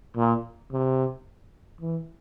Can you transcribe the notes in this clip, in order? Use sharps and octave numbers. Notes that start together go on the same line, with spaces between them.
A#2
C3
E3